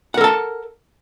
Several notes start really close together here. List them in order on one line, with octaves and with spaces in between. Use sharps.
F#5 A#4 A4 A5